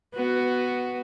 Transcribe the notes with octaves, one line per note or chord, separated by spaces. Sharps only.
B3 F#4